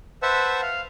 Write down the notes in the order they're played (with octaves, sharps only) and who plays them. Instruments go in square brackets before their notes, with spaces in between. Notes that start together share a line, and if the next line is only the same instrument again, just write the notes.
[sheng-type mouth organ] B4 C5 E5 F#5 A5 E6
F5